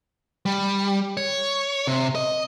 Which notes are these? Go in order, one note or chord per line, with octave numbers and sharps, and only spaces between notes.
G3
C#5
C3
D#5